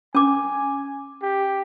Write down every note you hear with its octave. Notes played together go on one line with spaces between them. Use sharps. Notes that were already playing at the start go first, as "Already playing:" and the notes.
C#4 G#5 D6
G4